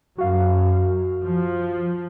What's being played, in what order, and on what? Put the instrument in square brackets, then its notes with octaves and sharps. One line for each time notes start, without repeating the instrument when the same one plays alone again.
[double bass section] F#2 [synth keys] F#4 F5
[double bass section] F3